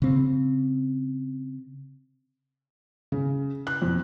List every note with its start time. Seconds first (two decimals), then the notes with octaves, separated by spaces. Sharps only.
0.02 C#3 C4
3.12 C#3
3.67 F#6
3.82 F2